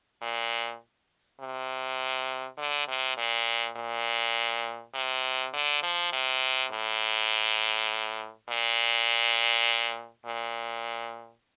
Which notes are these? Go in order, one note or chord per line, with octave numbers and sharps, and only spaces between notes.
A#2
C3
D3
C3
A#2
A#2
C3
D3
F3
C3
A2
A#2
A#2